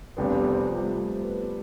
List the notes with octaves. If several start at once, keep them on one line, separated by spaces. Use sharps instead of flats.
F1 E2 C3 G3 B3 D4
C4
F3
G3
A3
B3